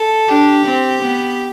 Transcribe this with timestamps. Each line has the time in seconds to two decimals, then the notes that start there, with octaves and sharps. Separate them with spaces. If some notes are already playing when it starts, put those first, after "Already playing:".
Already playing: A4
0.28 D4 G4
0.65 C4
1.02 B3